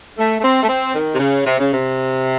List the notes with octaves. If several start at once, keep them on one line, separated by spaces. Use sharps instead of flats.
A3
A3
C4
A3
C4
D#3
C3
C#3
C3
C#3
C3